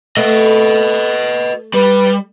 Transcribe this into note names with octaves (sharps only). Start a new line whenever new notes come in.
A3 B4 D#5
G3 B4